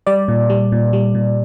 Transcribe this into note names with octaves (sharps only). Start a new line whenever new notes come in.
G3 D5
A#2
G3
A#2
G3
A#2